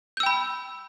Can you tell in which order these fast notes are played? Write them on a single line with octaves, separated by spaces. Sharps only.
G6 E6 G5 B5